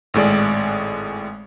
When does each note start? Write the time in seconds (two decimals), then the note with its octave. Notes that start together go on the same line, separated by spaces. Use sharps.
0.14 G#1 A2 G#3 D5